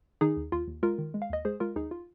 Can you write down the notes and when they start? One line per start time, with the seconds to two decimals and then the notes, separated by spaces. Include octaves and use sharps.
0.21 D#3 D#4 G#4
0.37 D#2
0.52 D#2 F4
0.67 D#2
0.83 G#3 F4 A#4
0.98 D#3
1.14 G#3
1.22 F5
1.30 D#2 D#5
1.45 G#3 G#4 C5
1.60 G#3 F4 A#4
1.76 D#2 D#4 G#4
1.91 F4